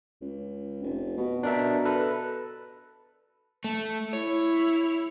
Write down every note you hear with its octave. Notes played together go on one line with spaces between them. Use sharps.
C#2
F1
B2
D4 A#4 E5
A4 B4
A3
E4 C#5